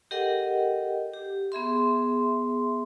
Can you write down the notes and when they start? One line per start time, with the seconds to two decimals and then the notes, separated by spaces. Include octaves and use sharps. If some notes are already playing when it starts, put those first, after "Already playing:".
0.11 G4 A4 A#4 D#5 F#5 G5
1.14 G4
1.52 B3 G#4 E5 C6